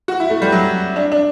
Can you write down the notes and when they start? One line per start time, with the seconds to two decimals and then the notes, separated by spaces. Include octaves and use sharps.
0.08 F#4
0.20 E4
0.30 A3
0.42 G3
0.52 F#3
0.96 D4
1.12 D4